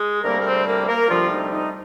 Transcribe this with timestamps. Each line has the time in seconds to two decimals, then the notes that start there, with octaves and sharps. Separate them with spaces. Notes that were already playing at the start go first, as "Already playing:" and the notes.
Already playing: G#3 G#4
0.24 D2 C3 G3 A#3 A#4
0.41 A#4
0.45 C4 C5
0.67 A#3 A#4
0.88 A#3 A#4
1.10 D2 C3 F3 G3 F4
1.31 D#4
1.52 D#4